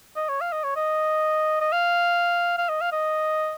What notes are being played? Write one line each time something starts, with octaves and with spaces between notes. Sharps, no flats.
D#5
C#5
F5
D#5
C#5
D#5
D#5
F5
F5
D#5
F5
D#5